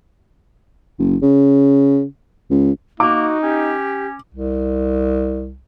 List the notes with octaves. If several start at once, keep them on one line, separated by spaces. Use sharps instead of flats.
F#1
C#3
C#2
A#3 D#4 F#4 D6
C#4 G4
C2